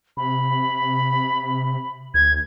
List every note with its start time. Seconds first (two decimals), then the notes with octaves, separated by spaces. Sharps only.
0.17 C3 B5
2.14 D2 G#6